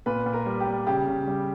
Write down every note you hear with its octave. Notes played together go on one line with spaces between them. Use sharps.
A#2 B4
A#2
A#4
G3
G4
G3
C#3 G4
C#3
G3